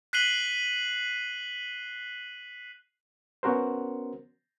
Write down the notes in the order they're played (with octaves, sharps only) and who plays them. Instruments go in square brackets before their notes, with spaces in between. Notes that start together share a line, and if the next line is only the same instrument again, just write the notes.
[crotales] F#6 B6 C7 D#7 F#7 G7
[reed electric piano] B3 C#4 F#4 A#4 C5